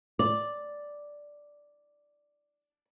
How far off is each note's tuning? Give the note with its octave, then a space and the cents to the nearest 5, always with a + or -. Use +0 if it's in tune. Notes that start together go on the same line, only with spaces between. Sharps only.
D5 +0